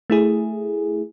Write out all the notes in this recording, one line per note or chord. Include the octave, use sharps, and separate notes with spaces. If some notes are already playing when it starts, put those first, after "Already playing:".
A3 E4 G#4